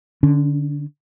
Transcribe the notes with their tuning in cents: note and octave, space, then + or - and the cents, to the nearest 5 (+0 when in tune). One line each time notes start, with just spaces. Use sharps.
D3 +0 C#4 +35